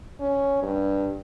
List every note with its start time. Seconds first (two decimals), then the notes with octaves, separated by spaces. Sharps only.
0.20 C#4
0.62 G2